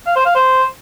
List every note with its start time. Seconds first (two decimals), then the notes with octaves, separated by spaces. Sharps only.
0.06 F5
0.16 C5
0.26 F5
0.35 C5